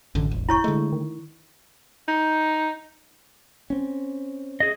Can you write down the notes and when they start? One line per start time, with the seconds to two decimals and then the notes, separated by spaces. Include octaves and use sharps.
0.15 A1 F#2 D3
0.31 E1
0.49 E4 C#5 C#6
0.64 D3 G#3 A3
0.92 D#3
2.08 D#4
3.70 C4 C#4
4.60 G#4 D#5